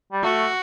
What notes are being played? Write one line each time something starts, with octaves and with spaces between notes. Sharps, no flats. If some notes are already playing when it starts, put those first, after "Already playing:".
G3
A3 F#4